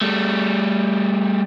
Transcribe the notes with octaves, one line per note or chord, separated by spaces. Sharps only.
G3 A3